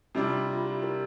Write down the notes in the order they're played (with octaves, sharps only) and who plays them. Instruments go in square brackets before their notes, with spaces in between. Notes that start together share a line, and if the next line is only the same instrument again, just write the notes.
[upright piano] C3 G3 D4 [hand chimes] E4
[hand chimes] F4
E4
F4
G4
G4 A#4